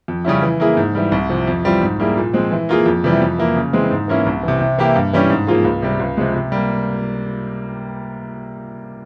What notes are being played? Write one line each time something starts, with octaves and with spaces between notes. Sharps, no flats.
F2
C#3 G3 C#4 E4
E3
A#3 E4 G#4
G#2
E3 G3
C2
C3 F3
F2
E3 G3 C4 F4
G#2
G3 A#3 E4 G#4
A#2
F3 G#3 C4
E3
A#3 F4 G#4
F2
C3 E3 G3
F2
E3 A#3 E4
C#3
E3 G#3 C4
G#2
E3 A#3 C#4 E4
C2
C3 E3
C3
E3 A#3 E4 G4
G2
E3 G3 C#4 G4
G#2
F3 A#3 F4 G#4
C#2
C3 G3
C#2
C3 F3 G#3
C3
G3 A#3